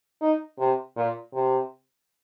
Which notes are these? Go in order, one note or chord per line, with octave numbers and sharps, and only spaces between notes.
D#4
C3
A#2
C3